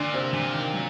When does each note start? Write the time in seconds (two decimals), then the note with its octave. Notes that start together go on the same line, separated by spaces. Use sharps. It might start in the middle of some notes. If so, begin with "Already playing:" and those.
Already playing: A#2 D3 D4
0.14 C3 C4
0.33 A#2 D3
0.54 D#3
0.74 F#3